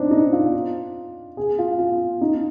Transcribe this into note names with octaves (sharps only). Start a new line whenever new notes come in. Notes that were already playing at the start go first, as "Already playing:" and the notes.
Already playing: C4 D4 D#4
D#4
F4
G#4
F4
F4
D#4